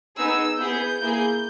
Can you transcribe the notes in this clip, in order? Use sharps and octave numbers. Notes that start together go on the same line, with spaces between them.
B3 D#4 G#4 E6
B3 E4 G#4 G6
A#3 E4 G#4